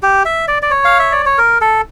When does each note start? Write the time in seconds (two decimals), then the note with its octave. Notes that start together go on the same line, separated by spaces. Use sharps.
0.03 G4
0.25 E5
0.48 D5
0.62 D5
0.71 C#5
0.85 F5
0.99 E5
1.12 D5
1.26 C#5
1.38 A#4
1.61 A4